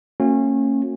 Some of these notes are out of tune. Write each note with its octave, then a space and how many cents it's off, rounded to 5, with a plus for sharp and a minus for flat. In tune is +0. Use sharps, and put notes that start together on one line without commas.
A#3 -45 C#4 -25 F#4 -35